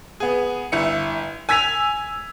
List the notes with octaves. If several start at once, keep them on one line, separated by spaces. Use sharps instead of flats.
B3 G#4
G1 E4 C#7
G#5 E6 G#6 B6 D#7 F7